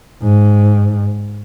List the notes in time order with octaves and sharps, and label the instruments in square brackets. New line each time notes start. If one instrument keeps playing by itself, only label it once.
[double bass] G#2